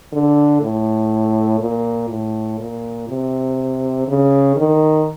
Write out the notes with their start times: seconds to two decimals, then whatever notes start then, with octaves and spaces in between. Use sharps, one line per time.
0.13 D3
0.61 A2
1.60 A#2
2.09 A2
2.59 A#2
3.09 C3
4.08 C#3
4.56 D#3